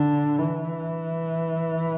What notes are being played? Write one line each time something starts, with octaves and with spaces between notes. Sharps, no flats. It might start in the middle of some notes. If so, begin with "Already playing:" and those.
Already playing: D3
E3